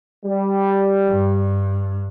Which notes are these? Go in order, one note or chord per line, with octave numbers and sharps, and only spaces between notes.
G3
G2